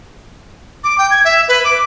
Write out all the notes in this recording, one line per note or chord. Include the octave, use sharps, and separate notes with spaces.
D6
G5
G#6
E5
B4
D6